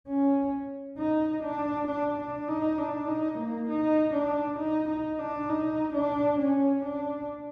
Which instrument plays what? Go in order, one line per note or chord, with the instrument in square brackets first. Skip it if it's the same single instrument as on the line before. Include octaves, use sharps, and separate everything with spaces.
[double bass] C#4
D#4
D4
D4
D4
D#4
D4
D#4
A#3
D#4
D4
D#4
D#4
D4
D#4
D4
C#4
D4